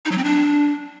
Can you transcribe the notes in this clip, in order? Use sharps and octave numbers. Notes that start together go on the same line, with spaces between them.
D#4
F#3
C4
D4